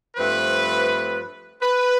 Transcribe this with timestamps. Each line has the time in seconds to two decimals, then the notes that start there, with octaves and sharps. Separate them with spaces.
0.16 G2 F3 A3 C4 B4
1.63 B4